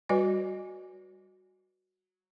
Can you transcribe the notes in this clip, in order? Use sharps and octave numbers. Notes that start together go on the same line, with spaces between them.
G3 F#4 B4 D#5 G#5